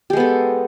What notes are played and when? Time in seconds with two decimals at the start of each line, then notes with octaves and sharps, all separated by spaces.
0.10 G4
0.13 G#3
0.17 B3
0.20 A4